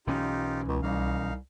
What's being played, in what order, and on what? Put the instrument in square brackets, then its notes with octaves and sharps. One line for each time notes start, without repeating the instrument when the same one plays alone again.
[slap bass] B1 E3 C#4 [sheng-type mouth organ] D#4 F4 G4
[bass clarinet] C#2
[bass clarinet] C2 [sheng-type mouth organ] D#4 F5